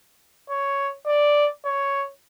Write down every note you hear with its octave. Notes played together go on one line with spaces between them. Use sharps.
C#5
D5
C#5